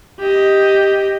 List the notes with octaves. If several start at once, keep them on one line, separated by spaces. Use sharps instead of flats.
G4 D#5